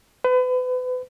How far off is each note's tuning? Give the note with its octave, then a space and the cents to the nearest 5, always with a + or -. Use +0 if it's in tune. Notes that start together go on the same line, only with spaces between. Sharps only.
B4 +35